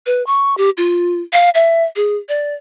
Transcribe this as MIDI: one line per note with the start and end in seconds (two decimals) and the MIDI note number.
0.06 0.24 71
0.26 0.57 85
0.57 0.70 67
0.77 1.21 65
1.33 1.50 77
1.54 1.84 76
1.96 2.16 68
2.29 2.54 74